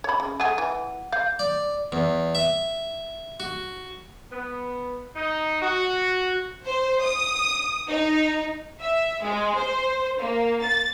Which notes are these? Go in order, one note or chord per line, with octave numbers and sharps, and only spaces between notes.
C#5 B5
C#3
A3 G#4 F#5 D#7
E3
F5 G6
D5
E2
E5
F#4
B3
D#4
F#4
C5
D#6
D#4
E5
G#3
C5
A#3
A6